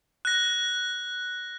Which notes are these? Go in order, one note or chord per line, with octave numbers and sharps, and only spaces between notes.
F#6 A#6